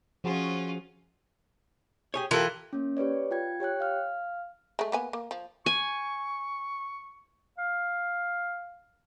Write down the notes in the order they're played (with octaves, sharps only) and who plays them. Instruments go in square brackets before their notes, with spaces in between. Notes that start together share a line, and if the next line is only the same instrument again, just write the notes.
[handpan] F3 F#4 G#4 [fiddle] C#4 F4
[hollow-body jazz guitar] G4 G#4 C#5
[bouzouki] E3 [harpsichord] F4 A4 [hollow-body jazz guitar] G4 A#4
[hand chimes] A#3 C#4
G4 B4 C#5 D5
F4 G5 G#6
G4 C#5 G5 F#6
F5 F6
[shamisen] G#3 A3
A#3 B3 G#5
A#3
F3
[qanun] G#5 [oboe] C#6
[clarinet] F5